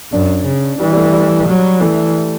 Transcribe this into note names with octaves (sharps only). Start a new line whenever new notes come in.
F#2 D4
C#3
E3 G3
G3
A3
G3
F#3
E3 A3